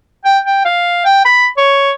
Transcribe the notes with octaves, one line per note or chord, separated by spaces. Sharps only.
G5
G5
F5
G5
B5
C#5